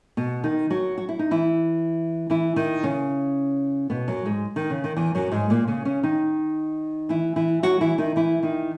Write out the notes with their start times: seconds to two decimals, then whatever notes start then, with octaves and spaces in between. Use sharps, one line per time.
0.17 B2 B3
0.43 D#3 D#4
0.70 F#3 F#4
0.98 F#4
1.09 E4
1.19 D#4
1.31 E3 E4
2.30 E3 E4
2.56 D#3 D#4
2.83 C#3 C#4
3.90 B2 B3
4.08 F#2 F#3
4.25 G#2 G#3
4.56 D#3
4.70 C#3
4.84 D#3
4.96 E2 E3
5.15 F#2 F#3
5.32 G#2 G#3
5.50 A#2 A#3
5.68 C#3 C#4
5.85 C#3 C#4
6.03 D#3 D#4
7.09 E3 E4
7.36 E3 E4
7.63 F#3 F#4
7.81 E3 E4
7.98 D#3 D#4
8.16 E3 E4
8.43 D#3 D#4